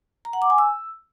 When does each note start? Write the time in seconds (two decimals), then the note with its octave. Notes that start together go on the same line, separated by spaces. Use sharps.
0.25 A#5
0.33 F#5
0.42 D6
0.50 G#5
0.58 E6